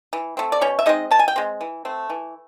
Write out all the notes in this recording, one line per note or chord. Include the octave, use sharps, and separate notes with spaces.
E3
A3 C4
D5
B2 C#4 C#5
E5
G#3 C4 D#4 D#5
B2 A5
G#5
G5
G#3 C4
E3
A3 C4
E3